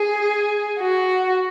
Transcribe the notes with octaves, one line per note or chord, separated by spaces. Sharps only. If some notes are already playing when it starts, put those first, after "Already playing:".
Already playing: G#4
F#4